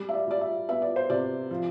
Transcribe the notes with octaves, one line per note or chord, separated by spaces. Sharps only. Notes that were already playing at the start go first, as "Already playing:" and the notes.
Already playing: G3
E5
D5
G3 D5
E5
B3 E5
D5
C5
C3 D5
F3